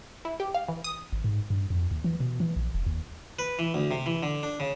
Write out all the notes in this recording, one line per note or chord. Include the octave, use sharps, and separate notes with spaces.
E4
G4
F5
E3
D#6
G#1
G#2
G2
F2
D#2
E3
B2
E3
A#1
F1
D#2
B4
E3
D2
C3
E3
D3
D4
C#3